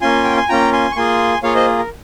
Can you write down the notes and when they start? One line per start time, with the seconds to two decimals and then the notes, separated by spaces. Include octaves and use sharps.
0.01 A#3 C#4 F4 G#5 C6
0.24 G5
0.37 G#5
0.49 A#3 C#4 F4 G5 A#5
0.72 G#5 C6
0.92 C#6
0.96 A#3 F4 G#4 G#5 C6
1.43 A#3 F4 G#4 C#5 F5
1.55 C5 D#5
1.79 A#4